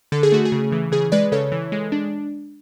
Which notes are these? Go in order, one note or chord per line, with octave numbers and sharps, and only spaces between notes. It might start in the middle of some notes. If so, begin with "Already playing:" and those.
D3 A4
G#4
A3 F#4
G#4
C#3
E3
C#3 G#4
G#3 B4 D5
C#3 A4 C#5
E3
G#3
D4